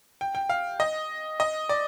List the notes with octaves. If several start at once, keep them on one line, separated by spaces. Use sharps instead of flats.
G5
G5
F5
D#5
D#5
D5